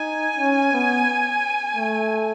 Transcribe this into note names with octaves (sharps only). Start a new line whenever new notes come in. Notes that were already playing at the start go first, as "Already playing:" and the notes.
Already playing: D#4 G#5
C#4
B3
A3